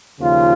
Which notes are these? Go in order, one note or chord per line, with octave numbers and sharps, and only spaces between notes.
D#2 C#3 F3 F4